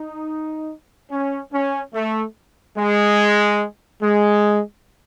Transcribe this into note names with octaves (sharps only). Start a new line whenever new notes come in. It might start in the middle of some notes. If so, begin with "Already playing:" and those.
Already playing: D#4
C#4
C#4
A3
G#3
G#3